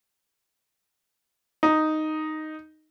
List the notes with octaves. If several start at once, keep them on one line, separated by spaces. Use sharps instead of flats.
D#4